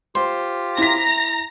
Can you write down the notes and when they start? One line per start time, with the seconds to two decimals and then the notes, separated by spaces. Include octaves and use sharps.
0.15 F4 G4 C5
0.78 E4 A#5 A#6 B6